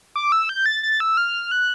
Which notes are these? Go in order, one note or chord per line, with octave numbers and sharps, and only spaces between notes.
D6
E6
G6
A6
A6
E6
F6
F#6